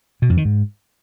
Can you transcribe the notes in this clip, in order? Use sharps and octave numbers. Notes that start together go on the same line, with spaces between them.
B2
F2
D#3
G#2